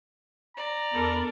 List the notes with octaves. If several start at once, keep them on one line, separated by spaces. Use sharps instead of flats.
D5 A#5
E2 D4 A4 A#4 B5